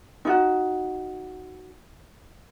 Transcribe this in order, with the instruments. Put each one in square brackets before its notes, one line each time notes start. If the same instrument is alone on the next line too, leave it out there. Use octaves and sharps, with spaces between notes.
[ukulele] D#4 F4 F#4